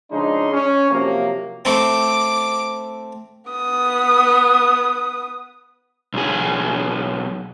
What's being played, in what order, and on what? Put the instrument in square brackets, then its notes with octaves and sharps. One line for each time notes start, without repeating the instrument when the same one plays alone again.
[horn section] C#3 F3 G#3 D4 D#4 C6
C#4
C3 F3 F#3 A#3
[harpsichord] A3 C4 [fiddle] D6
[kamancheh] B3 D#6
[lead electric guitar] B1 G#4